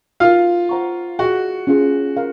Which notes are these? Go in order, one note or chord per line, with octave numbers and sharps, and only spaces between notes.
D#4 F4 F#4 A#4 F5
C5 F#5 A#5 C#6
F#4 G#4 D#5 F#5 C#6
C#4 F4 G#4
A#4 F5